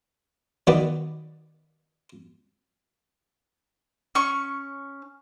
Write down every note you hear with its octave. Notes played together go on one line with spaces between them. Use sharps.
D#3 F#3 B3 B4 D5
C#4 C#6